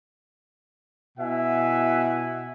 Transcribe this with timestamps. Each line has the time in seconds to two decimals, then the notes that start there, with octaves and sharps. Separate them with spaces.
1.18 B2 E4 E5 F#5 G#5